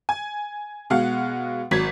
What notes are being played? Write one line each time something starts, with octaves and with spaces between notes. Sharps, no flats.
G#5
B2 G#3 F5 F#5
G#1 F#3 G#6 B6